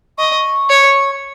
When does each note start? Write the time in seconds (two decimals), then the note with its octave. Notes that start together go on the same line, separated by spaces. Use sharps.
0.18 D#5 C#6
0.70 C#5